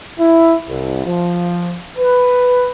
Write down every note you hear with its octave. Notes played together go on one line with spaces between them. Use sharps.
E4
C2
F3
B4